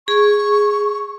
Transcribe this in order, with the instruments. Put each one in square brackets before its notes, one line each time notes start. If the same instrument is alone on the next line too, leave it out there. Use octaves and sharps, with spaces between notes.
[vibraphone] G#4 [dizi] C#6